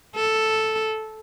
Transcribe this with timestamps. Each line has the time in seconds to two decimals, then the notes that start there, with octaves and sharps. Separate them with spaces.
0.16 A4